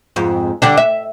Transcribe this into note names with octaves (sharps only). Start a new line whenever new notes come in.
F2 G#2
D3 G3 D4
E5